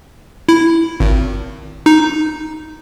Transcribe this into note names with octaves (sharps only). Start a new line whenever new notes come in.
E4
G#1
D#4